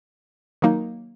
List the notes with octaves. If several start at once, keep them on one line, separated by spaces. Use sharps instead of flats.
D#3 F#3 A#3 D#4